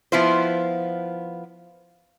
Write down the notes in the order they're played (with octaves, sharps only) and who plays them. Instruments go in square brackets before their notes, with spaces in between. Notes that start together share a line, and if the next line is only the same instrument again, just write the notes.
[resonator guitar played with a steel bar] F3 B3 E4 F4 C5